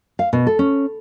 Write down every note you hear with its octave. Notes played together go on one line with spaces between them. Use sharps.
F5
B2
A4
C#4